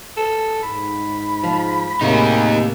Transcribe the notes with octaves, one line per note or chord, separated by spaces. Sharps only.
A4
G#2 B5
F3
A2 C3 A#3 D#4 G#4 A#4